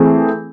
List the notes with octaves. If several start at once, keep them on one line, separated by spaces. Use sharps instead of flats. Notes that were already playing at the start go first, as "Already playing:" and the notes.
Already playing: E3 A3 C4 E4 G#4